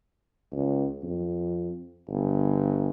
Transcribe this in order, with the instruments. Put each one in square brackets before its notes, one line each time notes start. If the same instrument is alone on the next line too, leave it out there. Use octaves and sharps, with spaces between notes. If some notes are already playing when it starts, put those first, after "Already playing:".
[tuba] C#2
F2
G1